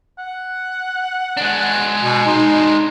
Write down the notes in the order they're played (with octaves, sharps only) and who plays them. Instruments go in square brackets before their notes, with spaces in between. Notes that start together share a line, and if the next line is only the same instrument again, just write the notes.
[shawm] F#5
[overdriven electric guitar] G#3 D4
[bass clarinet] B2
[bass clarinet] D#4 [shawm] C6